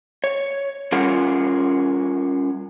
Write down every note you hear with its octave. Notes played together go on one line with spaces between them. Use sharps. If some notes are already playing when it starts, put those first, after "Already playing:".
C#5
G3 C#4 F4 G#4 A#4 F#5